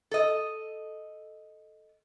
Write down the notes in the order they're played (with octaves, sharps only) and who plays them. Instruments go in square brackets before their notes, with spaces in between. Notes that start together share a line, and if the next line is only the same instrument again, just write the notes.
[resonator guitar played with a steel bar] A4 D#5